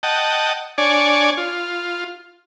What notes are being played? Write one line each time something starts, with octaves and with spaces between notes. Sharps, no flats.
D#5 F#5 G5 A5
D4 C#5 D5 G#5
F4